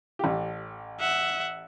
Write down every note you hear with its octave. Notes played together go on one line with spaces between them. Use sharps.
A1 G4
E5 F#5